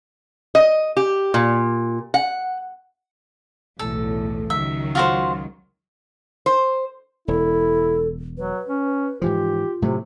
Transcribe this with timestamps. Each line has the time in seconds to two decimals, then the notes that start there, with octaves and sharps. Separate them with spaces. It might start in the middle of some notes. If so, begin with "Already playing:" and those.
0.55 D#5
0.97 G4
1.34 A#2
2.14 F#5
3.79 B1 E2 A2 A4
4.50 C#2 D#3 F#3 E5
4.95 F4 F#4 C5
6.46 C5
7.28 E1 E4 A4
8.38 F#3 B4
8.68 C#4
9.22 G#2 E3 F3 F4 G4
9.82 A2 C3 F#3 A3